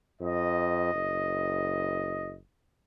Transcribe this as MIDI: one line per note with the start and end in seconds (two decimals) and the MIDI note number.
0.21 0.93 41
0.21 2.34 75
0.94 2.40 30